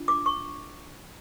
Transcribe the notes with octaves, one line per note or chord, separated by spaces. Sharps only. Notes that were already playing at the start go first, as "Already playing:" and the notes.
Already playing: D4 F4
D6
C#6